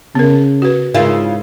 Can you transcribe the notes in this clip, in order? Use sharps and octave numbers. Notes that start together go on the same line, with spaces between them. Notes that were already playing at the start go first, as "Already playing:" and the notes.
C#3 B3 A#4
F#4 B4
G#2 C#3 E4 F4 A#4